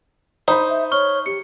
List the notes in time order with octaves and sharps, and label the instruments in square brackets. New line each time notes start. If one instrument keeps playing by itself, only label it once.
[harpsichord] D#4 [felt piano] C5 B5
[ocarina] E5
[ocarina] C#5 [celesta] C#6 F6 G7
[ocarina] G4 [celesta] C#7